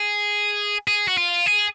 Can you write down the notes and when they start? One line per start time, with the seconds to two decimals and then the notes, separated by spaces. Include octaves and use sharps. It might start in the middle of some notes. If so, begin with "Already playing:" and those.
Already playing: G#4
0.88 G#4
1.08 F#4
1.17 F4
1.46 G#4